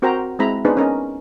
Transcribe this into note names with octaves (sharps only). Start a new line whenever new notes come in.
C4 F#4 A#4 C5 G5 A#5
G#3 C4 E4 A#5 B5
B3 D4 D#4 G#4 B4 C5
C#4 A#4 D#5